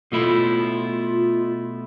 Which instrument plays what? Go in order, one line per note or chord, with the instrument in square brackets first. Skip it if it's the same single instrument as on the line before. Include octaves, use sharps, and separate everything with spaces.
[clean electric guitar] B2 A3 E4 [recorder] F4